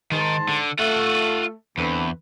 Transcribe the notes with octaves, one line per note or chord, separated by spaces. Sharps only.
G#2 D#3 A5 C6
D3
A3 F4 F#5
E2 D3 C4 B4